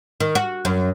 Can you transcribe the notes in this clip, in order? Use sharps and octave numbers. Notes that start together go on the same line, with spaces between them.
D#3
F#4
F#2